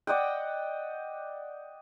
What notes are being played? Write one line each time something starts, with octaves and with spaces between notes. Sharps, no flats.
D5 D#5 F#5 G5